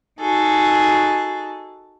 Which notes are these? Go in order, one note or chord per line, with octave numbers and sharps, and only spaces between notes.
D#4 F#4 G#4 A4